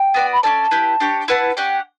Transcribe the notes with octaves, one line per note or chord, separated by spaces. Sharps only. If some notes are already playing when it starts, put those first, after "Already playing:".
Already playing: G5
B3 F#4 B4 D5
B5
C#4 E4 A4 D5 A5
E4 G4 B4
D4 G4 C#5
E4 B4 F#5 A5
C#4 G4 D5 F#5 G5